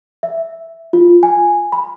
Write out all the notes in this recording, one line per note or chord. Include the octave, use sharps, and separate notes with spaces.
E5
F4
G#5
B5